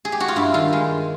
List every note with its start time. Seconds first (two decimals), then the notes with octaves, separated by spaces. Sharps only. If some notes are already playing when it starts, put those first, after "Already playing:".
0.05 G#4
0.12 G4
0.20 F#4
0.28 F4
0.36 G2 E4
0.54 D#3 F4
0.73 G#3